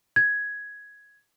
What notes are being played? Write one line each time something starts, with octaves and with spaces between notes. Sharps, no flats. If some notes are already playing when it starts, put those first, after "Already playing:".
G#6